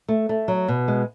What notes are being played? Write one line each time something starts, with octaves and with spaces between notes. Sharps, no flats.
A3
A3
F#3
B2
G#3